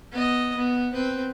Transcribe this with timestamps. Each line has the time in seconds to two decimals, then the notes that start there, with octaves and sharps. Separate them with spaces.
0.11 B3 D#5
0.55 B3
0.93 C4 B4